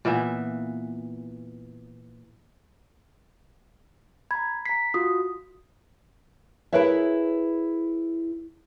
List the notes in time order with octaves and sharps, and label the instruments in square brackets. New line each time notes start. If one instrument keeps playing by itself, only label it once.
[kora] A#2 E3 B3 E5
[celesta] A#5 G#6 [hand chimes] B5
[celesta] A#5 C7 [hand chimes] B6
[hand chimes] F4 F#4 [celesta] D#6
[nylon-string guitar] E4 G#4 A#4 B4 C#5 E5